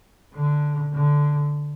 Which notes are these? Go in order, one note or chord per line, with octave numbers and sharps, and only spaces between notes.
D3
D3